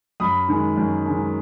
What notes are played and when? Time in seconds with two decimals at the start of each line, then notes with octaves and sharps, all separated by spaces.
0.20 F#2 B5 D#6
0.48 D#3 G#3
0.77 F#2
1.06 D#3 G#3